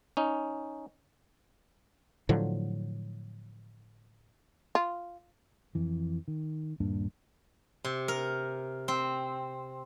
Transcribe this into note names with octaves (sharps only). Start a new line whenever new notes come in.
C#4 D#4
A2 D3 F3 F#3
F4
F2 E3
D#3
D#1 G2 A#3 D4
C3
A#4
C4